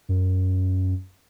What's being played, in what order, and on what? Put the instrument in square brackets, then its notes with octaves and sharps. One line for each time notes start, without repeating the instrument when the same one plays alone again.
[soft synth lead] F#2